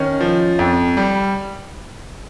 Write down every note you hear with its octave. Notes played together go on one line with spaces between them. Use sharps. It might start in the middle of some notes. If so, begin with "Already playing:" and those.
Already playing: D#3 C#4
F3
F2
G3